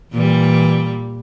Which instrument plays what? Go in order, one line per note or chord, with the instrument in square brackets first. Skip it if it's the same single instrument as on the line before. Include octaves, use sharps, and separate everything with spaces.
[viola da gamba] A#2 G3 [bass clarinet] E3